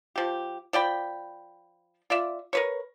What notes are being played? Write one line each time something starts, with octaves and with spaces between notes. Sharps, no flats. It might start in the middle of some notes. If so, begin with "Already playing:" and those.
F3 G4
F3 D5 G5 B5
F4 D5 E5
A#4 B4 C#5